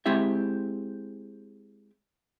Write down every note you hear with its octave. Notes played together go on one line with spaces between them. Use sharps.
G#3 C4 E4 G4 E5